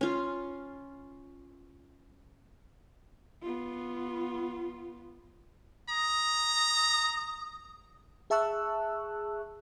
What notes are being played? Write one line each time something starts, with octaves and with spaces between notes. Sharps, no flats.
C#4 F4
B3 F4
A#5 D#6
G#4 E5 A5 C#6 E6 F#6